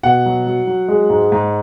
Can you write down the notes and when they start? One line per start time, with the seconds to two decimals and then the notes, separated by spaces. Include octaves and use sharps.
0.03 B2 F#5
0.26 F#3
0.47 F#3
0.67 F#3
0.88 G#3
1.10 G#2
1.32 G#2